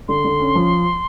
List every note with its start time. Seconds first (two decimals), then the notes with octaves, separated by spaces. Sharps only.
0.08 D3 C6
0.25 D3
0.40 C#4
0.55 F3